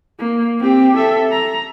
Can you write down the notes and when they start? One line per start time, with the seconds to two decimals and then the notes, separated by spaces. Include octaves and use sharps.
0.19 A#3
0.60 C4 G4
0.97 A4 E5
1.31 A#5